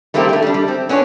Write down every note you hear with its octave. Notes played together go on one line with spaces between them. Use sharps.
G3 A3 A#3 C4 D4 G4
A3 D#4
G3 D4
G3
C4
B3 C#4 D4 G4 C#5